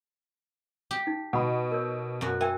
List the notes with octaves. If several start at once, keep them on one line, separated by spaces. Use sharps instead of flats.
G4
D#4
B2 F#5 B5
A#4 C#5
F#2 F#4
A#4 E5 G5 G#5